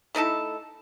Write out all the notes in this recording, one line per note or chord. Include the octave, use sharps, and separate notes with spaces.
A3 D#4 E4 A4